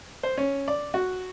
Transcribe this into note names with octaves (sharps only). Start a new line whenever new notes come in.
C5
C#4
D5
F#4